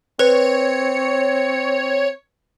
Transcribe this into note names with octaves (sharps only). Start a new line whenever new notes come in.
C4 B4 C#5